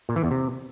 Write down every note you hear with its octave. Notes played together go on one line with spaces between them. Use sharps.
A#2
E3
E2
C3